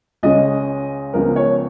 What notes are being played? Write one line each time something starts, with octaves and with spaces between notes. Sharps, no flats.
C#2 C#3 G#3 C#4 D#5
C#2 C#3 F3 B3 A#4
C#5